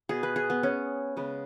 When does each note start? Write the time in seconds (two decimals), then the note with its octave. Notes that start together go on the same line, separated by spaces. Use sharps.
0.09 B2 B3 G#4
0.23 B4
0.36 G#4
0.50 B3
0.63 C#4
1.17 C#3 G#3 B3